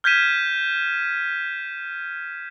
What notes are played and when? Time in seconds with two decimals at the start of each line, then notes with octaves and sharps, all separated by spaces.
0.04 F6 G6 G#6 B6 D#7 E7